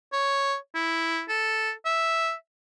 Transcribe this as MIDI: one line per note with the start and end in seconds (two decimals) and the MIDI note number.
0.13 0.55 73
0.75 1.23 64
1.29 1.72 69
1.85 2.33 76